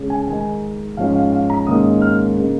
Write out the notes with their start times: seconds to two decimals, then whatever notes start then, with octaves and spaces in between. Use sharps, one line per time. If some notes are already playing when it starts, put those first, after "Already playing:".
Already playing: C#3 G#3 C#4
0.10 G#5
0.28 D#3 G#3 D#4 G#5
0.97 G#2 F3 C#4 F5
1.16 F5
1.32 F5
1.50 A#5
1.67 G#2 D#3 A#3 C#4 D#6
2.02 F6
2.37 C#3 A#3 D#4